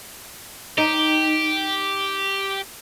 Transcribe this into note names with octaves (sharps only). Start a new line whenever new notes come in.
D#4 G4